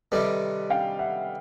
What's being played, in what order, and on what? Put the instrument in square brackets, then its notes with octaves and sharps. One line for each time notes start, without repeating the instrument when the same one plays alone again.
[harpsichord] C3 D#3 G3 [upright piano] A4 B4
[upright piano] F5 G5
E5 F#5